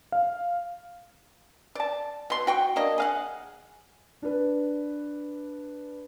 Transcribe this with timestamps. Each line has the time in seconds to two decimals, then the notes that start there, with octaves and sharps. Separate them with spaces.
0.12 F5
1.75 D5 A5
2.30 B2 C6
2.47 F#4 G5 C#6
2.76 A#3 D4 D#5
2.98 G#4 F5 F#5
4.22 D4 B4